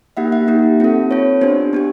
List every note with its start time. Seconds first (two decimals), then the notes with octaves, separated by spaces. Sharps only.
0.17 A#3 D#4 G4 E5 F#5
0.32 E5 F#5
0.48 A#3 D#4 G4
0.80 C4 F4 A4
1.11 C4 F4 A4 B4 C#5
1.41 B3 D4 G4 C5
1.73 B3 D4 G4